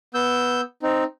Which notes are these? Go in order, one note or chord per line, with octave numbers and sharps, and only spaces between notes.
B3 E6 G6
C4 D#4